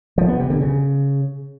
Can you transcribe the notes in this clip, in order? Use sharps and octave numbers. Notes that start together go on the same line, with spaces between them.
F3
B3
C3
D3
C#3